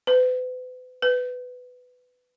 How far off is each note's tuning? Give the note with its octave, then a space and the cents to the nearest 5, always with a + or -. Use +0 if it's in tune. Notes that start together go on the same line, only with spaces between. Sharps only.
B4 +40
B4 +15